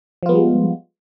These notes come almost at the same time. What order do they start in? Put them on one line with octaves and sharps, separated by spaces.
F3 F4 B3 G3 G#3